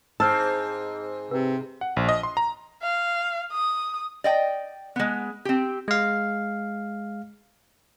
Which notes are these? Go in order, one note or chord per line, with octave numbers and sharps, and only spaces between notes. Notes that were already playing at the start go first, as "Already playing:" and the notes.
G#2 C4 A5 E6 F6
C3 B4
F#5
A#1
D#5
C6
A#5
F5
D#6
D5 D#5 G5
G#3 B3
C4 G4
G#3 F5